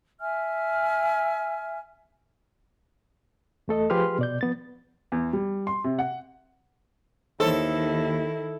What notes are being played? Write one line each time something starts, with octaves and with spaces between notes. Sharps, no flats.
E5 G#5 F6
E2 A3 A4 D#5
F3 G4 G#4 B4 C6 F6
B2 D5 G6
F3 B3 A6
E2
G3
C6
C3
F#5
D#2 D#3 D#4 E4 A4 C5 C#5